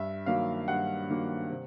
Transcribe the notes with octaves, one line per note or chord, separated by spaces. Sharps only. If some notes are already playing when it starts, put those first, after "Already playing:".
Already playing: G2 E5
D#3 F#3 A#3 F5
G2 F#5
D#3 F#3 A#3
C3